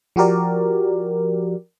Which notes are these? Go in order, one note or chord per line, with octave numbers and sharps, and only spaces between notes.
F3 F#4 G4 A#4 D5